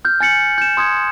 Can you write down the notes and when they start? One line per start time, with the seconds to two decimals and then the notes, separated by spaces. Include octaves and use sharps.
0.05 F6 G6
0.20 G#5 A6 C#7 F#7
0.58 G6 E7
0.77 C6 D#6 G6 G#6 C#7